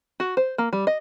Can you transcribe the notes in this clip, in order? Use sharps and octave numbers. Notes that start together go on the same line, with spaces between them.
F#4
C5
A#3
G3
D#5